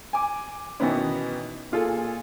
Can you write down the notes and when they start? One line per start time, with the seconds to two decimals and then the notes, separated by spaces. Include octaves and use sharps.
0.13 G#5 D6
0.80 B2 D#3 E3 B3 C#4
1.72 A#2 F4 G#4 A4